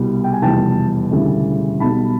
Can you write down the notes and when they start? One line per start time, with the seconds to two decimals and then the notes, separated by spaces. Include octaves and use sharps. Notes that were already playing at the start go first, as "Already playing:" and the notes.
Already playing: C2 B2 G3
0.24 G5
0.33 G#5
0.42 F1 E2 B2 G3 G5 A5
1.11 E1 D2 C#3 E3 G3
1.80 B1 B2 G3 A5 B5